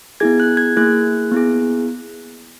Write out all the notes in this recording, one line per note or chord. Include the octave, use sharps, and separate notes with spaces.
B3 E4 G#4 G#6
F#6
G#6
A#3 E4 G#4 F#6
B3 E4 G#4